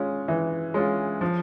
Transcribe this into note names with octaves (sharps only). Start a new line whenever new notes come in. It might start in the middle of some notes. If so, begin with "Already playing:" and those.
Already playing: G#3 C#4 F4
E3
G#3 C#4 F4
F3